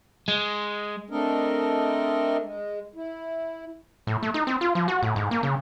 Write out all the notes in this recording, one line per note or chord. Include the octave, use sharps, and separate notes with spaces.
G#3
A3 C4 D4 A4 A#4 D#5
G#3
E4
A2
A3
D#4
C4
F4
F3
F#4
A2
G#2
A#3
C#3